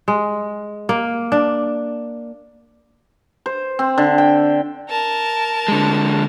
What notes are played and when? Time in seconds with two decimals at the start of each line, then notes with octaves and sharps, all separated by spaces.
0.08 G#3
0.89 A#3
1.32 D4
3.46 C5
3.79 C4
3.98 D3
4.18 G5
4.90 A#4 A5
5.68 D3 G#3